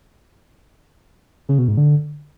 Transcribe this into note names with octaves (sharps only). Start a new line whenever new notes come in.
C#3
B2
G#2
D3